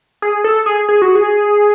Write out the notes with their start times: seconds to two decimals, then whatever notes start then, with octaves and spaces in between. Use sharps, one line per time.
0.22 G#4
0.44 A4
0.66 G#4
0.89 G#4
1.02 F#4
1.15 G#4